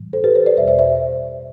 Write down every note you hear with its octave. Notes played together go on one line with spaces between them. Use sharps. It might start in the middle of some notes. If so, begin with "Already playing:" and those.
Already playing: A2 E3 G3
A4 C5
G4 B4
A4 C5
B4 D5
E2 B2 G3 C5 E5
C5 E5
C5 E5